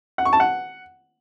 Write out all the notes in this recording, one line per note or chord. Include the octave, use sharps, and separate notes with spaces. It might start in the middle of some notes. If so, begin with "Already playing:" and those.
F#5
C#6
A5
F#5